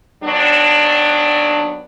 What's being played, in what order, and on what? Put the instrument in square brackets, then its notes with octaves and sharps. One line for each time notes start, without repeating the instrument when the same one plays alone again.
[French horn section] D#2 F#3 B3 D4